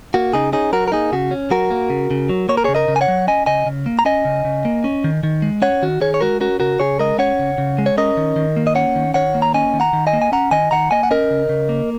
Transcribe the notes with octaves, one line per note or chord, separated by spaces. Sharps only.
A#3 F#4
C#3 D#4 G#4
C#4 D#4 G#4
F#3 F#4 A#4
A#4
A#3 D#4 G#4
C#3 F#4
C#4
F#3 F#4 A#4
A#3
C#3
C#3
F#3
A#3 C#5
A#4
C#3 G#4 C#5
A#4 D#5
C#3
G#5
C#5 F#5
F#3
C#4 D#5 G#5
C#3 D#5 G#5
C#3
A#3
A#5
C#4 D#5 G#5
C#3
C#3
A#3
C#4
D#3
D#3
G#3
C#4 C#5 F#5
D#3 F#4
D#3 G#4 C#5
C#5
G#3 F#4 A#4
C#4 F#4 A#4
C#3 F#4 A#4
C#3 G#4 C#5
G#3 A#4 D#5
C#4 C#5 F#5
C#3
C#3
G#3
C#5
C#4 A#4 D#5
D#3
D#3
A#3
D#5
C#4 C#5 F#5
D#3
D#3 C#5 F#5
A#3
A#5
C#4 D#5 G#5
D#3
F#5 A#5
D#3
D#5 G#5
A#3
G#5
C#4 F#5 A#5
D#3 D#5 G#5
D#3 F#5 A#5
A#3 D#5 G#5
F#5
C#4 A#4 D#5
C#3
C#3
A#3